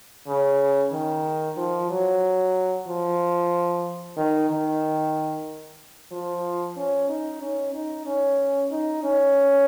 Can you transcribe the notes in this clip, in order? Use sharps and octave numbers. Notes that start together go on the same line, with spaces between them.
C#3
D#3
F3
F#3
F3
D#3
D#3
F3
C#4
D#4
C#4
D#4
C#4
D#4
C#4